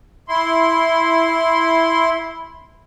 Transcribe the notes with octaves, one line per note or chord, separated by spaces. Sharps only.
E4 C6